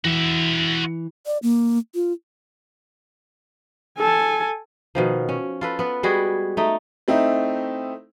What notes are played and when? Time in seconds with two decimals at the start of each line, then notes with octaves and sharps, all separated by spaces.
0.05 E3 F#4 E5
1.26 D5
1.43 A#3
1.95 F4
3.99 A4 G#5
4.95 B2 D#3 F3
5.29 C#4
5.61 F4 A4 B4
5.79 B3 B4
6.03 G3 G#3 F#4 G#4
6.57 A3 D#4
7.08 A3 C4 D#4 E4